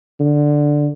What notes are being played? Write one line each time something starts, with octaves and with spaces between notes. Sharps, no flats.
D3